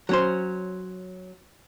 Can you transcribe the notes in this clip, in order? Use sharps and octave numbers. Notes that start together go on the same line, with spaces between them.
F#3 C#4 C5